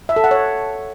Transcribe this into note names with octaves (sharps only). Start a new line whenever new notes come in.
E5
A4
F#5
C#5